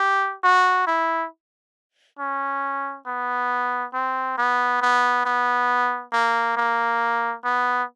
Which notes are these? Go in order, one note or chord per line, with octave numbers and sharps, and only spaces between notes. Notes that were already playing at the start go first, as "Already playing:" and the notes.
Already playing: G4
F#4
E4
C#4
B3
C4
B3
B3
B3
A#3
A#3
B3